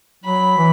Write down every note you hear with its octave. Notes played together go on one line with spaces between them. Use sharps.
F#3 B5
E3